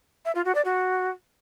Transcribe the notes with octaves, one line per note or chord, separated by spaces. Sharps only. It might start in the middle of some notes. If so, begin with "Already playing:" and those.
E5
F4
F#4
D5
F#4